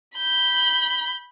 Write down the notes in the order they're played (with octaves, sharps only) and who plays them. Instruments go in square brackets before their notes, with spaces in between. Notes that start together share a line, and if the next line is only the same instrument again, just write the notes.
[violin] B5 G6